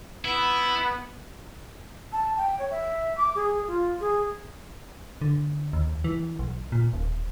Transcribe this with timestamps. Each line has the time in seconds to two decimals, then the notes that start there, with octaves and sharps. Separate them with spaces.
0.25 B3 E4
2.13 A5
2.37 G5
2.59 C#5
2.71 E5
3.17 D6
3.35 G#4
3.68 F4
4.00 G#4
5.22 D3
5.73 D#2
6.04 E3
6.39 B1
6.72 A#2
6.93 D#1